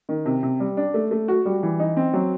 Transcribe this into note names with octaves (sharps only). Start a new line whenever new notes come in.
D#3
C3
C3
G3
D4
A3
A3
F#4
G3
E3
D#4
C4
F#3